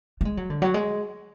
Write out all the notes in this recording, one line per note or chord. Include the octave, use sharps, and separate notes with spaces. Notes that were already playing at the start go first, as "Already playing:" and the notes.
A3
G#3
F#3
D3
F#3
G#3